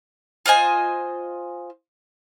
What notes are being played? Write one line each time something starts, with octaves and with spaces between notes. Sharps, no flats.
F4 C5 D#5 G#5